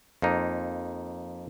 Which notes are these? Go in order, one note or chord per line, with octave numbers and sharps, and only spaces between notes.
F2 A#3 D#4